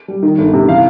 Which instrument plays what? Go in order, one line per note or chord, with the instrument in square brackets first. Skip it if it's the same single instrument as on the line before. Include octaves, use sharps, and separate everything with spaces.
[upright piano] G3
D#3
G1
C3
E3 F5